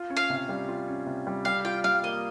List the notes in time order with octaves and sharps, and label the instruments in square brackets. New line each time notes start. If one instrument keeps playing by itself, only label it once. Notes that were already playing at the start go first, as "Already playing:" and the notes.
Already playing: [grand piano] F4
C#4
[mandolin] F5
[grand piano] C3
G3
F4
C#4
C3
G3
[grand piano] G3 [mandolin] F5
[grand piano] F4 [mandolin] G5
[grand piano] G3 [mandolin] F5
[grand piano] A#3 [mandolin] D#5